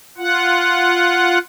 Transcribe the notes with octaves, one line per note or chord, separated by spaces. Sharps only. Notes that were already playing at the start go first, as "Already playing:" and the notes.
F4 F#5